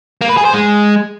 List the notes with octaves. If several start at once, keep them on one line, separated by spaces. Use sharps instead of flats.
A#3
B4
G#4
C5
G#3